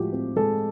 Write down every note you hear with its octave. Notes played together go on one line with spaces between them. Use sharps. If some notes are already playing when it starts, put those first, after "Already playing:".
Already playing: A2 F3 G#3 F#4 G4
C4
G#3 A4